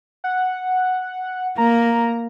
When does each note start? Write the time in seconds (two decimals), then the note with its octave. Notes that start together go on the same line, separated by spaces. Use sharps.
0.24 F#5
1.58 A#3 A#5